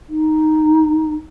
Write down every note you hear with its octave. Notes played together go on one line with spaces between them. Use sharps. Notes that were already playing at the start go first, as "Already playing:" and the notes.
D#4